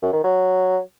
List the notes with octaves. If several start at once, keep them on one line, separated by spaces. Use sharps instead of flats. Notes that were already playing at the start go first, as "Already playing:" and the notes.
F#2
D#3
F#3